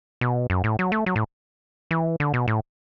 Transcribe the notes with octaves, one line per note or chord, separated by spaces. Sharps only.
B2
F#2
A2
F#3
A3
F#3
A2
E3
D3
B2
A2